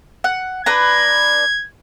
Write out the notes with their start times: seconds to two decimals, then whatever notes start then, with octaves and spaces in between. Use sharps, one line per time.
0.24 F#5
0.66 D4 B4 A#5 G#6